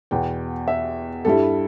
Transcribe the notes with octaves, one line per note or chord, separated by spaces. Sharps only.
E2 B2 B3 G5
E5
G2 G3 E4 A4